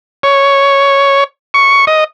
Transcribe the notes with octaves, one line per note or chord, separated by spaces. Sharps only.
C#5
C#6
D#5